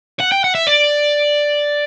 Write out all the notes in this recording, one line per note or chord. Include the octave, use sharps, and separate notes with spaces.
F#5
G5
F#5
E5
D5